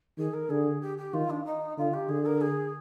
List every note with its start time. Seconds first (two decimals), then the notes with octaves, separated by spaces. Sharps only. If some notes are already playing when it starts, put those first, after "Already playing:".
0.18 D#3 G#4
0.34 A#4
0.50 D3 G#4
0.81 G4
0.98 G4
1.14 D#3 F4
1.30 D4
1.45 D#4
1.78 D3 F4
1.94 G4
2.09 D3 G#4
2.26 A#4
2.41 G#4